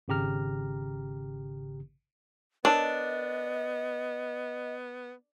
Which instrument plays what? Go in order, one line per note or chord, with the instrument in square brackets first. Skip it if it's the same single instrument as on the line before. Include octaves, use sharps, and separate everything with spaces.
[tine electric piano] G#1 C#3 G4 A#5 F6
[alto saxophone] B3 [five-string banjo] D4 [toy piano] A#4 C#5 A5 [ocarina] D#5